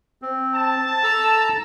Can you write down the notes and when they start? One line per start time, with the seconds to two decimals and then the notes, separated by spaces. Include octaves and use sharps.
0.22 C4
0.55 A5
1.04 A4 A#5 E6